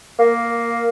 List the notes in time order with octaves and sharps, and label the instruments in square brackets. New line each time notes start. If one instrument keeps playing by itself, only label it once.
[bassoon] A#3